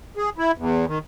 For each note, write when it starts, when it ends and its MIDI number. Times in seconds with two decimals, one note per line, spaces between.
0.17 0.30 68
0.38 0.51 64
0.58 0.85 40
0.87 0.98 51